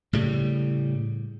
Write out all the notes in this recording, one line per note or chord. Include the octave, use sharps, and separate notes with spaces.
A2 C#3 G3